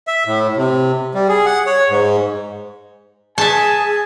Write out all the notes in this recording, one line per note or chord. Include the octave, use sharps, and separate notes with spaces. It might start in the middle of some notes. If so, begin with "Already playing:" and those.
E5
A2
C3
G3
G#4
F#5
C#5
G#2
G#4 E5 G#5 A5